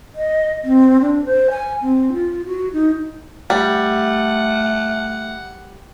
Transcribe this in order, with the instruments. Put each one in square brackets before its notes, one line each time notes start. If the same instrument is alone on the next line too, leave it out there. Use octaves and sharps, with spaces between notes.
[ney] D#5
C4
D4
C5
G#5
C4
F4
F#4
D#4
[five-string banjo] G3 [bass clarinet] A3 [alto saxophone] F#5